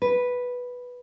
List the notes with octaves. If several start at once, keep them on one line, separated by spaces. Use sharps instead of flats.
B4